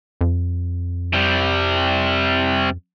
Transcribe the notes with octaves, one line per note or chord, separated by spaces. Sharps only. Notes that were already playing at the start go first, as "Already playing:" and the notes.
F2
C3 G3